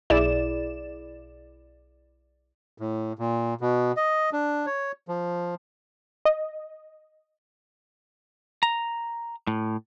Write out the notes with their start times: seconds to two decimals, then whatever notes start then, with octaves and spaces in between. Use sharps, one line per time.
0.10 B1 E4 G#4 D5 E7
2.78 A2
3.19 A#2
3.61 B2
3.97 D#5
4.33 D4
4.66 C#5
5.08 F3
6.25 D#5
8.63 A#5
9.47 A2